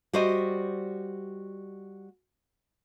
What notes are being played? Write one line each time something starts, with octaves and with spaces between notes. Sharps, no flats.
G3 F#4 C5 D5 D#5